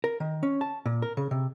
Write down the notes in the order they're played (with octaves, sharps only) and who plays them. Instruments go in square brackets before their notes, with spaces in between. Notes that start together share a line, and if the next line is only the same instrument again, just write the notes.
[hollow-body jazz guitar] A#4
D#3
C#4
A5
A#2
A#4
C#3
C3